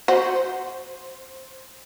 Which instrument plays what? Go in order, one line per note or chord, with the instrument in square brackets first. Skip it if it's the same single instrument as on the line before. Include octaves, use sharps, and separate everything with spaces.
[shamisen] F#4 [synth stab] C5